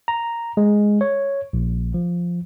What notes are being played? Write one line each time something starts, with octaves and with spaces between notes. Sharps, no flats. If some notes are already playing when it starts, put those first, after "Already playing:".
A#5
G#3
C#5
A#1
F3